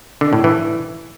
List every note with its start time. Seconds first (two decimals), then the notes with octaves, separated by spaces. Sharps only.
0.21 D3
0.33 A2
0.44 E3